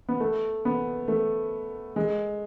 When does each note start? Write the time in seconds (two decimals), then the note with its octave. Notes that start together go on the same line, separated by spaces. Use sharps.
0.09 B3
0.20 A3
0.65 B3
1.08 A3
1.96 G#3